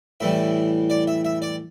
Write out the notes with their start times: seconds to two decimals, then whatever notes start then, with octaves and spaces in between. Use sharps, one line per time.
0.20 A2 E3 G3 E5
0.90 D5
1.07 E5
1.25 E5
1.42 D5